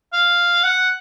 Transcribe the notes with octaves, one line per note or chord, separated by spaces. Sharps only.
F5
F#5